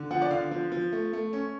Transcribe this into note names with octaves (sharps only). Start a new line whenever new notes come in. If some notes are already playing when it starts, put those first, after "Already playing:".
Already playing: D3
F3 F#5
D5
D3 F5
F3
F3
A3
A3
C#4